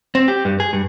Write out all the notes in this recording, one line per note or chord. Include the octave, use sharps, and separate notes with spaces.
C4
G4
G2
G#4
G2